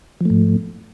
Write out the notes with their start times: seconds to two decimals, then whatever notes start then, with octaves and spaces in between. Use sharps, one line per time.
0.21 F3
0.25 A3
0.30 G#2